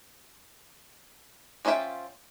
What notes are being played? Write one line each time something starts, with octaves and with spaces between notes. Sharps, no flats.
F3 C#4 F4 E5 G5